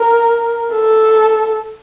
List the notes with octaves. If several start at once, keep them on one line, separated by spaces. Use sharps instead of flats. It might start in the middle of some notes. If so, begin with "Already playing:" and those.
Already playing: A#4
A4